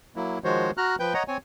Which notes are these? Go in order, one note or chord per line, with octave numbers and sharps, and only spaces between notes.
F#3 A#3 E4
D#3 F3 G#3 F#4 C5 C#5
F#4 A#5 F6 F#6
F3 B4 G5 G6
C#5 D#5 F#5 A#5
C4 C#5 G#5